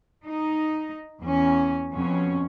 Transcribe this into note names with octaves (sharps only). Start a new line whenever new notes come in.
D#4
E2 C#4
F2 B2 C#4